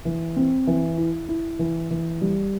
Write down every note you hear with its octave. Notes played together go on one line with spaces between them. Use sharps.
E3
C4
E3
E4
E4
E3
E3
G3